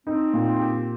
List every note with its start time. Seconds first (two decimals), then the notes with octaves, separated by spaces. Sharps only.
0.07 C4 D#4
0.34 A#2
0.59 G4